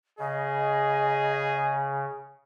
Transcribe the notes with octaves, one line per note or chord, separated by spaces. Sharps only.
C#3 G#4 D#5